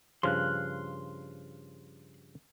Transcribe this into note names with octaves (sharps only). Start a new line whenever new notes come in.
G2 C#3 F3 C6 F6 F#6